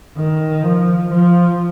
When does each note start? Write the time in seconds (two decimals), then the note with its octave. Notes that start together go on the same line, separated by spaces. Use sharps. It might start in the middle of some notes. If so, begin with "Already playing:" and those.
0.17 D#3
0.63 F3
1.10 F3